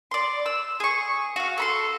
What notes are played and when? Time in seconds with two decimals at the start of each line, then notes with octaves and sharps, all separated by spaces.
0.11 D5 C6
0.46 E6
0.80 G#4 C#6
1.36 F#4 F5
1.58 A4 B5 C6